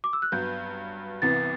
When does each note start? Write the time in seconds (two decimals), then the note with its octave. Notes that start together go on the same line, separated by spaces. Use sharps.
0.04 D6
0.13 E6
0.22 F#6
0.32 G2 F#3 B3 G6
1.22 C2 C3 E3 B3 A6